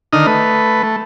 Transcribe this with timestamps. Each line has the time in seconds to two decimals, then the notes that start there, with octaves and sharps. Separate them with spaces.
0.13 D3 D#3 D#4 D#6 F6
0.27 A3 B4
0.83 A3